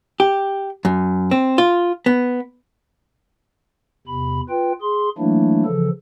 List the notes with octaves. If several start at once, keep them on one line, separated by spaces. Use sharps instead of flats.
G4
F#2
C4
F4
B3
E2 C3 B5
F4 B4 G5
G#4 C6
E3 F#3 A3 A#3 D4 E4
C#3 E3 F3 A4